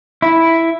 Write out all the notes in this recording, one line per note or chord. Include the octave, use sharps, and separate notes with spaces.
E4